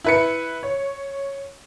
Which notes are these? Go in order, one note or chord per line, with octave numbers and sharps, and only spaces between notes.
E4 B4 C#7
C#5